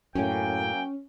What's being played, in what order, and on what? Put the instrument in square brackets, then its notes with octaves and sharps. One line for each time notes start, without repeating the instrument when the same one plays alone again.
[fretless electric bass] F#2 A2 [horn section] F#3 A#3 G5 [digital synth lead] C#4 [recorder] G#5